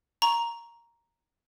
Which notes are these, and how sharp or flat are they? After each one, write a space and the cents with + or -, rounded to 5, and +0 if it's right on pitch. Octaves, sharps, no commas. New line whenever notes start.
A#5 +0 C#6 +0